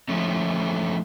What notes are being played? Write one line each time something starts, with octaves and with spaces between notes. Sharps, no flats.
D3 F3 A3 C#4